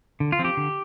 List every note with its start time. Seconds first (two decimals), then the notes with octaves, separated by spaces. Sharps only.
0.20 D3
0.32 F4
0.39 F3 C4
0.44 G4
0.57 D3